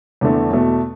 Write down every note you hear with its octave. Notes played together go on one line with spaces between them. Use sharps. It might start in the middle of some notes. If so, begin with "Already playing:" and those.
E2 D3 A3
E2 B2 A3